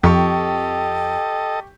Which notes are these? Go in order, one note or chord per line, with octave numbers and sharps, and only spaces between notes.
F2 G4 A4 D#5 G5 C#6